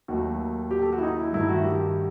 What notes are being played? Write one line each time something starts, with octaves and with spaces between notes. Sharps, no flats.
D#2 D#3 F#3 A3 F#4
G4
A4
F#4
E4
D#4
E4
G2 D#3 A3 E4
F#4
G4